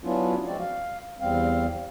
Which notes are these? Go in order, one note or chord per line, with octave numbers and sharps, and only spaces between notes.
F#3 B3 C#4 D4 E4 F4
F3 G#3 C4 F#4 D5
F5
E2 G3 C4 F5